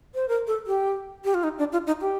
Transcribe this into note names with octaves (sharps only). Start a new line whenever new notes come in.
C5
A#4
A4
G4
G4
F4
D#4
D4
F4
D#4
G4